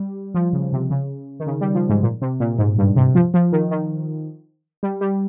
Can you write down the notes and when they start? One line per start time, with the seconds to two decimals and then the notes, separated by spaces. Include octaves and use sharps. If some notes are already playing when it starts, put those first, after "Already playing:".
Already playing: G3
0.35 F3
0.53 C#3
0.73 C3
0.90 C#3
1.40 D#3
1.47 C#3
1.61 G3
1.75 F3
1.89 G#2
2.03 A#2
2.21 C3
2.40 A#2
2.58 G#2
2.78 G2
2.96 C3
3.15 F3
3.34 F3
3.52 D#3
3.71 D#3
4.83 G3
5.01 G3